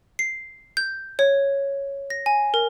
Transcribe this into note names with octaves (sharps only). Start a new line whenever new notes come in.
C7
G6
C#5
A#6
G#5
A#4